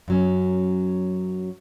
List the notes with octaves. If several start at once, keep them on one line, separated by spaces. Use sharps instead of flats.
F#2 F#3 C#4